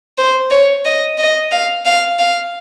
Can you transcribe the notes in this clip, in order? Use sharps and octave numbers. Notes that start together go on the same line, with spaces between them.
C5
C#5
D#5
D#5
F5
F5
F5